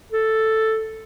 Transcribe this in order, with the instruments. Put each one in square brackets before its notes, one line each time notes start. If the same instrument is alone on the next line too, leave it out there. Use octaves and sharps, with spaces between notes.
[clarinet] A4